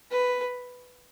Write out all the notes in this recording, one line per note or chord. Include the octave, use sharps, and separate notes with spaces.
B4